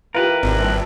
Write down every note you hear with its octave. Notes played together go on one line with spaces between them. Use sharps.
E3 F4 G4 A#4 B4
G#1 C3
A#1 G2